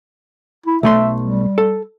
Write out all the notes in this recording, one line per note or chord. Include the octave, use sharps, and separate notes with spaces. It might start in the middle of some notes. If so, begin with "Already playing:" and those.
E4
B1 A3 E5 C6
G3
A4